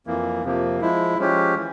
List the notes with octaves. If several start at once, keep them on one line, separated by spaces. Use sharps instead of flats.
F2 E3 A#3
F2 C3 F3 A#3
F3 G#3 E4
F3 G#3 C#4 G4
E3